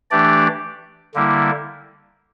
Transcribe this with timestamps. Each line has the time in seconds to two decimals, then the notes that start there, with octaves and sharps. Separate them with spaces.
0.10 E3 A3 D4 G4 D5
1.14 D3 G3 A#3 E4